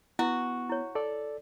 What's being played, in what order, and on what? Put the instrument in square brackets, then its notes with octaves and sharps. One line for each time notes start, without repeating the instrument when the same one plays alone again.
[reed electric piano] B3 [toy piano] E4 [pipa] F#4
[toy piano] E4 C#5
[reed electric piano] A4 D5